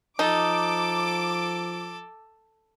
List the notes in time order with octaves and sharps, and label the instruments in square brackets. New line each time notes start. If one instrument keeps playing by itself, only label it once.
[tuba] F3 [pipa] D#4 [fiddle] A4 [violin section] D6